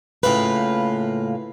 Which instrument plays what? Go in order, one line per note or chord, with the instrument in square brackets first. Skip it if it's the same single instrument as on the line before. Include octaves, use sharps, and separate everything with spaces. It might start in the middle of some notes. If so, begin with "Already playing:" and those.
[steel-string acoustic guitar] A2 C#3 A#3 F4 B4